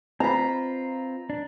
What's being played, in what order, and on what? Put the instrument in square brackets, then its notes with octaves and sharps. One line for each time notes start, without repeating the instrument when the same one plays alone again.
[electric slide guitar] C4 F4 [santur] A#5 B5
[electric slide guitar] D4